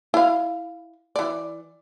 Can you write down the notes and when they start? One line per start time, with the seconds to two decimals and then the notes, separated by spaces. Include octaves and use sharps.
0.14 E4 F5
1.16 E3 D5